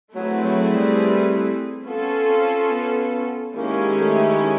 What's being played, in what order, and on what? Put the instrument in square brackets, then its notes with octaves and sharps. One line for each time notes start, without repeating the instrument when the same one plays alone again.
[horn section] F#3 [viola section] A3 C4 E4 G#4 B4
[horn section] F#3
G3
[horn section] B3 [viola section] C#4 F4 A4
[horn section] C4
B3
[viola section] D#3 G#3 C#4 E4 G4 [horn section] A#3
[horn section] A3